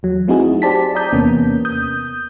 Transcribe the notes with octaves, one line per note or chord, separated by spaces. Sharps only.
E2 F#3
A3 C4 D#4 E4 F#4 G#4
G4 C5 D5 A5 B6
D5 A5 A#5 D#6 G6
E2 C3 A#3 B3 C#4
D#6 G6